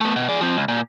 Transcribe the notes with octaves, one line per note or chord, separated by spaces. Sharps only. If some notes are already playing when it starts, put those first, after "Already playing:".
A3 B3
B2
G#4 D5
F3 C4
C#2
A#2